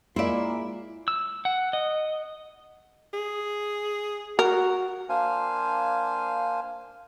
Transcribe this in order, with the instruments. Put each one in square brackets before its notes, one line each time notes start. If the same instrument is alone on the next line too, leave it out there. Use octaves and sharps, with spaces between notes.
[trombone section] G#3 A#3 [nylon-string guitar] E4 E5 [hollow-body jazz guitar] F4 D5
[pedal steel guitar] E6
F#5
D#5
[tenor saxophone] G#4
[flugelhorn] F#4 [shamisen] A#4
[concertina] A#3 D4 C5 F5 G#5